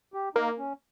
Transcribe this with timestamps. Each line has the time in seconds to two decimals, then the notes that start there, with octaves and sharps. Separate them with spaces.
0.14 G4
0.35 A#3 D#4
0.58 C#4